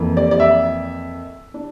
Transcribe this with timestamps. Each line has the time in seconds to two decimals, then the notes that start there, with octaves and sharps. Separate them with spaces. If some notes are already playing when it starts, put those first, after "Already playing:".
Already playing: F2 E3 A#3
0.17 D5
0.31 D5
0.40 E5
1.54 D4